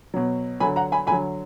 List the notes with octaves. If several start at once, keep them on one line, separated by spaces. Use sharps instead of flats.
B2 F#3
D3 F#3 G#5 B5
F#5 A#5
G#5 B5
D3 F#3 G#5 B5